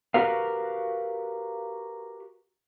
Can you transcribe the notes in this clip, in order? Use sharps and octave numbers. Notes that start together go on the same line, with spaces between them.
F#4 G4 A#4 B4 F5